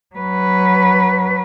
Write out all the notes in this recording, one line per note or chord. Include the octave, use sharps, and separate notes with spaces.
F#3 B4